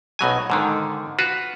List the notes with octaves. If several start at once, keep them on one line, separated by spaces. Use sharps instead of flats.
B1 B2 F#3 G#5
G#2 D3 D#3
F4 F#4 B4